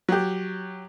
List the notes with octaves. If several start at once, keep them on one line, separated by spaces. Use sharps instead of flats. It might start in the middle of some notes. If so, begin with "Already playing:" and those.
F#3 G4